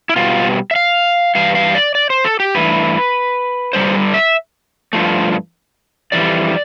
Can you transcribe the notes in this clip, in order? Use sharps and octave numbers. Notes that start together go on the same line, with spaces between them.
E4
B2 G3 F4
E5
F5
G2 E3 F5
F5
D5
D5
C5
A4
G4
G2 E3 A3 B4
G2 D3 G3 C5
E5
G2 F3 A3
F2 E3 G3 D5